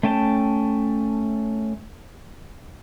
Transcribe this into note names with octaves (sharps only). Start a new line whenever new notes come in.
A3 C#4 G5 A5